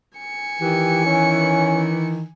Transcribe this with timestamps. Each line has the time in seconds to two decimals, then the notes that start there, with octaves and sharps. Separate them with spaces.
0.18 G#5 C#7
0.62 D#3 E3 G4
1.06 C#4